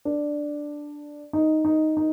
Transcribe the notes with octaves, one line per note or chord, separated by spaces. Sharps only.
D4
D#4
D#4
D#4